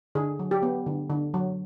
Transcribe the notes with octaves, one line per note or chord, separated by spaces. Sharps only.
D3 G#4
F#3
G4
B3
D3
D3
F#3